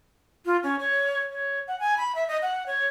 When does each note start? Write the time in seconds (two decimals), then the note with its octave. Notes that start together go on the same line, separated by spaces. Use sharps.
0.46 F4
0.63 C#4
0.79 C#5
1.30 C#5
1.68 F#5
1.80 G#5
1.97 B5
2.15 E5
2.28 D#5
2.42 F#5
2.67 C#5